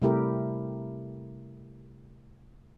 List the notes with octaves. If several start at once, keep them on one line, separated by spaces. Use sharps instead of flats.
C3 G3 A3 E4 G4 A#4